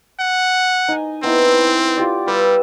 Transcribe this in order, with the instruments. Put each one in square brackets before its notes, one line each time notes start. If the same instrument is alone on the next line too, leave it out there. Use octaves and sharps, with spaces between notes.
[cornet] F#5
[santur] D#4 G#5
[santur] B3 D#4 E4 [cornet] C4
[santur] F4 G4 D5
[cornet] G3 [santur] B4 E6